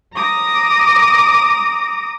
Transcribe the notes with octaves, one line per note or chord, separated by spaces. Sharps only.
A#5 D6 D#6 A#6